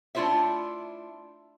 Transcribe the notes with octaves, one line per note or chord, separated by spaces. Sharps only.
A3 D4 E4 F4 C5 E5